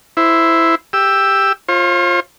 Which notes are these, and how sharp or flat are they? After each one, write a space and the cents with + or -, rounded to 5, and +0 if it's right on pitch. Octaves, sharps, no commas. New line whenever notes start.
E4 +0 C5 -10
G4 +10 E6 +0
F4 +0 C5 +45